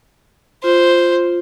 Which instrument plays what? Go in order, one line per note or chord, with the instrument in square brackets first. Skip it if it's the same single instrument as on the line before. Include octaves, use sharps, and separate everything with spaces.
[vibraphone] F4 [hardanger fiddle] C5